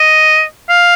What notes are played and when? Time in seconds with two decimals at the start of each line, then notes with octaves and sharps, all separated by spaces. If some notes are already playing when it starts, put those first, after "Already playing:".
Already playing: D#5
0.69 F5